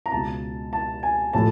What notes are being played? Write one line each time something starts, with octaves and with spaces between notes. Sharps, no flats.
A#5
C#2 B2 A5
A5
G#5
A2 F3 A5